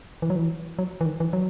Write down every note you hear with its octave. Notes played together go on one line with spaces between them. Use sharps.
E3
F#3
E3
F#3
E3
D#3
E3
F#3